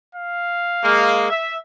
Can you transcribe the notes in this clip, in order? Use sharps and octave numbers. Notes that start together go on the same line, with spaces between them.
F5
G#3 A#3
E5